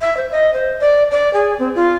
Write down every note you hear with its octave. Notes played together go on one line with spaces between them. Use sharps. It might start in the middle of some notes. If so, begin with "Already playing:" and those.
E5
C5
D#5
C5
D5
D5
G#4
C4
F4